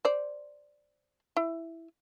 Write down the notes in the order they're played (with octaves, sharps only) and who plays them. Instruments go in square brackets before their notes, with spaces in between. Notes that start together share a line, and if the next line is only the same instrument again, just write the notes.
[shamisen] C5 D5
E4